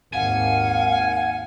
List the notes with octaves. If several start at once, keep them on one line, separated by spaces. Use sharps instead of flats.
G#1 D#2 F5 F#5 G#5